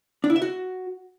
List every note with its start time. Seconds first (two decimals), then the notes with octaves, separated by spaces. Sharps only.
0.24 D4
0.30 E4
0.36 E5
0.42 F#4